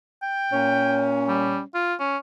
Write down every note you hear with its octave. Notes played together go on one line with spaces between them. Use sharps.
G5
A#2 C#4
G3
F4
C#4